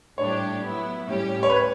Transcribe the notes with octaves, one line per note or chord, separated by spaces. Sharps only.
A2 G3 D4 G4 C#5
F#3 B3 E4
A2 G3 C#4 G4
C#5
B4